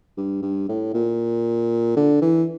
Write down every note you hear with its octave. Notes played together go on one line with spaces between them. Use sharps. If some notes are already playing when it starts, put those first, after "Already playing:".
G2
G2
A2
A#2
D3
E3